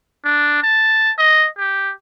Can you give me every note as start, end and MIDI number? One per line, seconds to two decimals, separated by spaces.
0.25 0.61 62
0.63 1.11 81
1.18 1.47 75
1.58 1.92 67